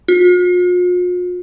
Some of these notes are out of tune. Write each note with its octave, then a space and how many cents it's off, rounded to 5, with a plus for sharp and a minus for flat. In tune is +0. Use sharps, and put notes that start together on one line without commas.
F4 +45